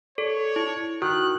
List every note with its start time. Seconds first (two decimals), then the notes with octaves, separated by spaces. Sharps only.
0.18 A4 C#5 D5
0.56 E4
1.02 D#3 F#4 F#6